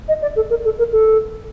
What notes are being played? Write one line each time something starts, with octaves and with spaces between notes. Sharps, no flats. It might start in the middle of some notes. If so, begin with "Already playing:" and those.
D#5
D5
A4
A#4
A4
A#4
A4